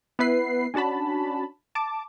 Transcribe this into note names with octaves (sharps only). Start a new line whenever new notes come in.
B3 E4 B4 C7
C#4 D4 F#4 A5 B5
A5 D6